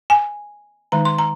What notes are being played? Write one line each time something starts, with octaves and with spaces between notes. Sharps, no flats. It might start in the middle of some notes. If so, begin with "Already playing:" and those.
G#5
D#3 G#3 D#4 A#5
C6
A#5